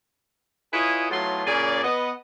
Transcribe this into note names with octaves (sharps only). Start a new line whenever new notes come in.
E4 F4 G#4 B4 C#5 D#5
A2 F#3 A3 B3 F4 C6
A#2 C#3 C#4 G#4 D5
B3 D#5